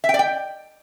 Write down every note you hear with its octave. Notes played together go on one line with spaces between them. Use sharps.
E5
G5
D5
G5